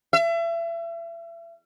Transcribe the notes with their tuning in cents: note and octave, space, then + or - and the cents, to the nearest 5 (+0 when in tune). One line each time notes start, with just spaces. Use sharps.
E5 +35